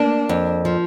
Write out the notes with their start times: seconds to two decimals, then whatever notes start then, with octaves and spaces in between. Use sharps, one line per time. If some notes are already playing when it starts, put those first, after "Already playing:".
Already playing: A#3 D4
0.29 F2
0.65 F3